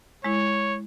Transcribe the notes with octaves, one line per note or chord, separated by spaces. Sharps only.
G#3 E4 C#5